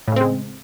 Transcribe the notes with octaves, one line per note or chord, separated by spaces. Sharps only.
A2 C#3 G#3 C4